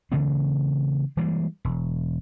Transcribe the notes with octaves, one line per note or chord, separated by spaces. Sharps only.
C#3 E3 A3 C4
E3 G3 G#3 A#3
E1